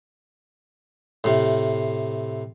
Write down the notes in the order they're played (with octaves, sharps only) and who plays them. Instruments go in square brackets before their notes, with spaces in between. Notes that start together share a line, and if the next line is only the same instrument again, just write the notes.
[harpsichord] A2 C3